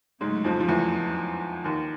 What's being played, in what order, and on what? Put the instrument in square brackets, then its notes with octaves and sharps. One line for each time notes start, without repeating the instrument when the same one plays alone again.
[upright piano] G#2 G#3 [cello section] C#3 F#3 A3
[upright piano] F2 F3
F3
E2 E3
D#2 D#3